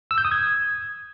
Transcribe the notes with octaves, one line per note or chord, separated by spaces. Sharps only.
E6
G6
D#6
G#6